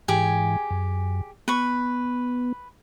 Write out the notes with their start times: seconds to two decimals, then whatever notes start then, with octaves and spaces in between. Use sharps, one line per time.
0.08 G#2 E3 G4 G#4 G#5
0.71 F#2
1.48 B3 B4 C#6